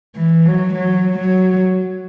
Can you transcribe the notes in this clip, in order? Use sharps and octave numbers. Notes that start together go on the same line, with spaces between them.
E3
F#3
F#3
F#3